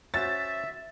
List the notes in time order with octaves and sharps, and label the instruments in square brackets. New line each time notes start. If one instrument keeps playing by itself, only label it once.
[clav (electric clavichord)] C#4 F#4 C5 [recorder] E5 [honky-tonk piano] A6